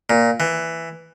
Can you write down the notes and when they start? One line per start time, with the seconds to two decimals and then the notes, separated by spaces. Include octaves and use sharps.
0.10 A#2
0.40 E3